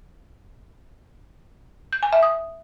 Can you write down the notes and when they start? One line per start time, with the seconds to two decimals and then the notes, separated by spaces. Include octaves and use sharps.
1.93 G6
2.03 G#5
2.13 E5
2.23 D#6